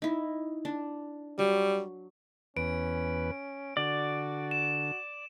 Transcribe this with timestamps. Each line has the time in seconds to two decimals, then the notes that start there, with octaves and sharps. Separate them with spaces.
0.02 D#4 E4
0.65 D4
1.39 F#3 G3
2.57 E2 C#4 B4 D7
3.77 D3 F#4 D5
4.51 E7